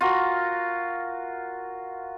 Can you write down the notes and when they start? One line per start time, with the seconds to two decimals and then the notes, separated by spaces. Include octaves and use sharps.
0.01 F4 F#4 A#4